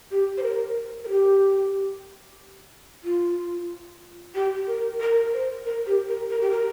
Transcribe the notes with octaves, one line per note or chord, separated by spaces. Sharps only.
G4
C5
A#4
A#4
G4
F4
G4
A#4
A#4
C5
A#4
G4
A#4
A#4
G4
A#4